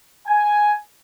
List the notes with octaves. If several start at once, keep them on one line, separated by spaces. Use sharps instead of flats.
G#5